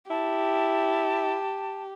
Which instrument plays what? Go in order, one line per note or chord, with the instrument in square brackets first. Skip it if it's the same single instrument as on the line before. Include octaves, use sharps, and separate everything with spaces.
[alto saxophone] E4 [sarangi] G4 [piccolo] A5